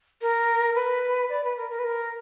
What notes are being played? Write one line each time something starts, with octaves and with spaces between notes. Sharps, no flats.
A#4
B4
D5
B4
A#4
A#4
B4
A#4